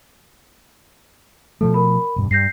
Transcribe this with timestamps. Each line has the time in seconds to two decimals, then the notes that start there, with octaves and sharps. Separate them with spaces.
1.61 B2 F3 A3 A4
1.74 A#4 B5
2.16 E1 G2
2.31 G2 G6 A#6 C7